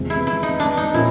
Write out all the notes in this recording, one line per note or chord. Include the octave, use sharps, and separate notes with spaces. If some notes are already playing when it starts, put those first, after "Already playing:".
Already playing: E2 C3 F3 G#3
E4
E4
D#4
D4
D#4
A#2 F3 A#3 C#4 E4